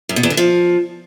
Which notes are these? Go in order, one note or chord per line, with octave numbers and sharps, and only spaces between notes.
F#2
B2
E2
D3
F3